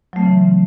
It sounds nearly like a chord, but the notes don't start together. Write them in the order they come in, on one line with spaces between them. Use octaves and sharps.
F#3 A3 C4 C#3 E3